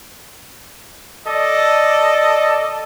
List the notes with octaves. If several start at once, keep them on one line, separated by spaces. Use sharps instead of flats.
A4 D5 D#5